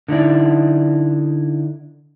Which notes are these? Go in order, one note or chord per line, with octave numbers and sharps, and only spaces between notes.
D3 D#4 E4 D5